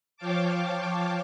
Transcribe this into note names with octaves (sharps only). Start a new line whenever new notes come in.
F3 C#5 F5 G5 A5 D6